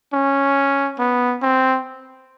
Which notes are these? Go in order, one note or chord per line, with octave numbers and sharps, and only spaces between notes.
C#4
B3
C4